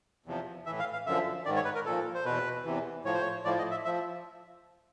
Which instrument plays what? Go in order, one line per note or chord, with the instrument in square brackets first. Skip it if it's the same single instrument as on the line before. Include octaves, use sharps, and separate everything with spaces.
[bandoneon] E2 C3 F3
A2 E3 E5
F5
F5
F#2 D3 F3 E5
G#2 D#3 D5
C#5
B4
A#4
A#2 F3 A4
C5
E2 B2 B4
E2 C3 E3
A2 F3 C#5
C5
C#5
A2 F3 D5
D#5
E5
F3 E5